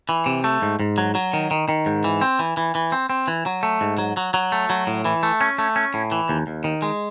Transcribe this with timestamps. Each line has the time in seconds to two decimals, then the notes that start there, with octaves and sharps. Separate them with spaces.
0.09 E3
0.26 C3
0.44 A3
0.62 G#2
0.79 G#2
0.98 F#3
1.15 F#3
1.33 D#3
1.51 D#3
1.69 D#3
1.86 G#2
2.04 E3
2.21 C4
2.39 E3
2.57 E3
2.75 E3
2.92 C4
3.10 C4
3.28 E3
3.46 F#3
3.63 A3
3.81 G#2
3.98 F#3
4.17 F#3
4.34 F#3
4.52 A3
4.70 F#3
4.87 A2
5.05 E3
5.23 A3
5.41 C#4
5.58 A3
5.76 C#4
5.94 A2
6.12 E3
6.29 D#2
6.47 D#2
6.64 D#3
6.82 G#3